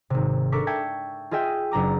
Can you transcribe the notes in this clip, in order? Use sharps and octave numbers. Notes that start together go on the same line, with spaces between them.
G#1 C3
D4 A4 A#4 C#6 D6 B6
E5 G5 A5 G#6 B6 C#7
F4 G#4 D#5 E5 G5 G#5
F#1 D4 A#5 D6